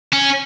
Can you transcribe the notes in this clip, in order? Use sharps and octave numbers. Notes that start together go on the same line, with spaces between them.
C#4